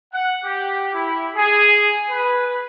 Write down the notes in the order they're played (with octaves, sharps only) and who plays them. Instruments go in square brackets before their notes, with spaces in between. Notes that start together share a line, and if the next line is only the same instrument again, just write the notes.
[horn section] F#5
G4
E4
G#4
B4